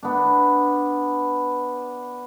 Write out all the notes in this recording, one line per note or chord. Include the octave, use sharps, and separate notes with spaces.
B3 D4